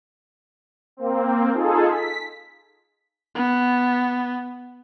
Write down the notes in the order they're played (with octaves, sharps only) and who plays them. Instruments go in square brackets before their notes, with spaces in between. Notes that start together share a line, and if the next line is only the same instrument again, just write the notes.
[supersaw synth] A#3 C4
D#4 F4 G#4 A4
B6
[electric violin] B3